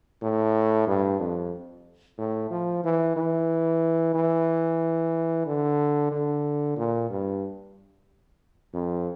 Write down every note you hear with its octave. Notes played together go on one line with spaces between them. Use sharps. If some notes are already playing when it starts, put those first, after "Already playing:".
A2
G2
F2
A2
F3
E3
E3
E3
D3
D3
A#2
G2
F2